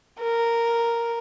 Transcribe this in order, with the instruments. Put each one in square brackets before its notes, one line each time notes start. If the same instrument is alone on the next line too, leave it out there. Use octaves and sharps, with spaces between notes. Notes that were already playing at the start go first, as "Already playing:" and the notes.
[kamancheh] A#4